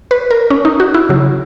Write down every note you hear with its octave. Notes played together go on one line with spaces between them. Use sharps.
B4
A#4
C#4
D#4
F#4
E4
C#3 F#3